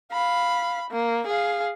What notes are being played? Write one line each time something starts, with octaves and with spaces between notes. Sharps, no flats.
F5 B5
A#3
G#4 F5